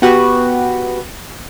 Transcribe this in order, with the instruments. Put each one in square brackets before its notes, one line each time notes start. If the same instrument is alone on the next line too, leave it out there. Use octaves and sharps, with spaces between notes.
[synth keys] B3 F#4 G4 B4